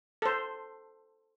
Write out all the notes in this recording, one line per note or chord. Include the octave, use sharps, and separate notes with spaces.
A4 C5